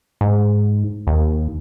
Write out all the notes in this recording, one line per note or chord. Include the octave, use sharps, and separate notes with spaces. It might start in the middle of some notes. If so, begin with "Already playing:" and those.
G#2
D#2